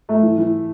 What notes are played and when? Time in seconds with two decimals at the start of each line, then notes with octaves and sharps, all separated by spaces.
0.09 A3
0.22 E3
0.38 E3